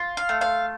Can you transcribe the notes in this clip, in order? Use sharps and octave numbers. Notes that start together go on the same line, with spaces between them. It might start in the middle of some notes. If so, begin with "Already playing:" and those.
Already playing: F4
F5
A3
F5